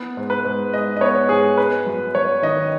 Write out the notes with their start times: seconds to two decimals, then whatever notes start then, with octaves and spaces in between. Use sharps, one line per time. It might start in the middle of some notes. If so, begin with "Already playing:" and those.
Already playing: B3
0.17 G#2
0.30 B4
0.44 G#2
0.74 G#3 D#5
0.97 D#5
1.01 B3 C#5
1.29 G#2 G#4
1.58 B3 B4
1.87 F#2
2.15 F#2 C#5
2.42 D#3 D#5